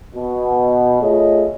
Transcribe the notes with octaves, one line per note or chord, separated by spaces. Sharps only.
B2
A3 F4 G#4 A4 C#5 D#5